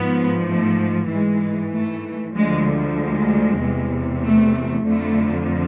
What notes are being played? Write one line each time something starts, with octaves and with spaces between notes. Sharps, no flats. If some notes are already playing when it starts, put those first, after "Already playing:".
Already playing: G#2 F3 B3
A3
G#2 E3 G#3
A3
D2 D3 F3 G#3
G#3
E2 C3 E3
A3
F2 D3 F3 A3